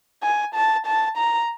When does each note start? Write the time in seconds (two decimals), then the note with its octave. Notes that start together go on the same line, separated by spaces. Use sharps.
0.23 G#5
0.55 A5
0.87 A5
1.18 A#5